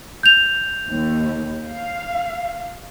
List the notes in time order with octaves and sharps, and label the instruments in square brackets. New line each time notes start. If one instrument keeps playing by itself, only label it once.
[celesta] G6 F7
[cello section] D#2
F5